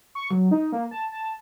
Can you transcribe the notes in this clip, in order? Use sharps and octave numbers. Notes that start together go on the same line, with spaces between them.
C#6
F#3
D#4
A#3
A5
A5